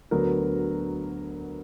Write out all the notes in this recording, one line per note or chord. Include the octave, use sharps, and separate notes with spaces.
D2 D3 F#3 B3 A#4